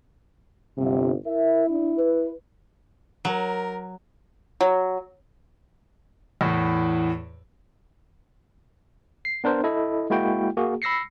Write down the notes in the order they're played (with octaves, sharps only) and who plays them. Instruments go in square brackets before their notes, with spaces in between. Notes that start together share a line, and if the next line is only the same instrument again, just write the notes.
[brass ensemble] G1 [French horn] C3
[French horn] E4 [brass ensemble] A#4 E5
[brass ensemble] D4
B4
[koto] F#3 [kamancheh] A#4
[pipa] F#3
[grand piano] E2 A2
[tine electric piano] C7
B3 D4 A#4 C5
E4 A4 D#5
G#3 A#3 E4 F#4 G5
A#3 F#4 G#4
B5 E6 A#6 C7 C#7